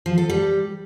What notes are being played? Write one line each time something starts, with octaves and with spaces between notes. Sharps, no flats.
F3
A4
G3